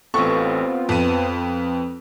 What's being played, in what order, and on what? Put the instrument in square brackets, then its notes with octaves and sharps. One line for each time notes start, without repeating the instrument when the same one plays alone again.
[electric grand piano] A1 A4 [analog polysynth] B3 C4 F4 [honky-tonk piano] C#6
[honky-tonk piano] F2 [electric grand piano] F3 B4 D#7